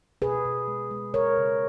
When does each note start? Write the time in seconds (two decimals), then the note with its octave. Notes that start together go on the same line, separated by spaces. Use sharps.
0.22 B2 G#4 B4
0.45 B2
0.68 G#3
0.91 G#3
1.14 C#3 A#4 C#5
1.37 C#3